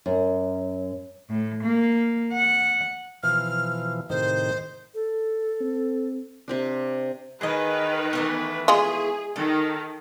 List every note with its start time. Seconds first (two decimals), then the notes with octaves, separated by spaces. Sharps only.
0.06 F#2
1.30 A2
1.63 A#3
2.33 F#5
3.23 B2 E3 F3 F6
4.10 A2 C3 D#3 C5
4.94 A4
5.61 C4
6.48 C3 C4 D4
7.41 D#3 G#4 B4 D#5
8.13 E3 A3 B3
8.68 G#3 F4 G#4
9.36 D#3 A4